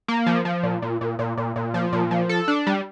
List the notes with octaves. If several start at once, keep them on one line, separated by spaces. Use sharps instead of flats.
A#3
F3
F3
A#2
A#2
A#2
A#2
A#2
A#2
F3
A#2
F3
A4
D4
G3